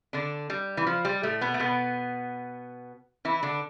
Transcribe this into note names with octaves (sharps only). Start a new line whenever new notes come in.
D3 D4
G3
E3
F3
G3
A2 A3
B2 B3
A3
B2 B3
E3 E4
D3 D4